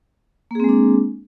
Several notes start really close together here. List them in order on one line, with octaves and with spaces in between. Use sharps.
A#3 G#4 C4 G#3 D4